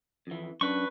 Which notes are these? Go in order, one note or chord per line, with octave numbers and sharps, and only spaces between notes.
F2 E3
F#2 D4 B4 C#6